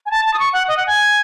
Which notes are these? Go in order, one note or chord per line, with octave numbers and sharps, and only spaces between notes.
G#5
A5
A5
D#6
C#6
F#5
D#5
F#5
G#5